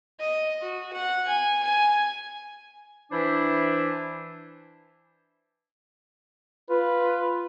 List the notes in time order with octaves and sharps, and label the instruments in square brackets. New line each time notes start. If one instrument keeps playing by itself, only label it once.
[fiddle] D#5
F#4
F#5
G#5
G#5
[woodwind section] E3 D4 E4 C5 E5
[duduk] F4 [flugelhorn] B4